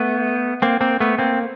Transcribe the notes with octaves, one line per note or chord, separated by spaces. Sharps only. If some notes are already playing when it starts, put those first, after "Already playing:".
Already playing: A3 B3
A#3 C4
A#3 C4
A3 B3
A#3 C4